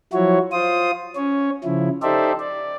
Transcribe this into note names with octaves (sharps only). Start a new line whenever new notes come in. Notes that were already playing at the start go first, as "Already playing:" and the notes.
F3 F#3 E4 F#4 C#5
F4 C5 D#6
C#4 C#5
C#3 F3 E4
D#4 G4 A4 C5 D5 E5
D5